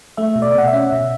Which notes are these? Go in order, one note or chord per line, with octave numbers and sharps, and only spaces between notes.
A3 E5
B2
D5
B2 F#5
E5
C#4
B2